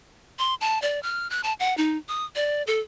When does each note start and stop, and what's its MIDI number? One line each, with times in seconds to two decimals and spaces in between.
0.39 0.55 84
0.61 0.81 81
0.82 1.02 74
1.03 1.30 89
1.30 1.41 90
1.44 1.53 81
1.60 1.76 78
1.77 1.97 63
2.08 2.25 87
2.36 2.63 74
2.67 2.80 69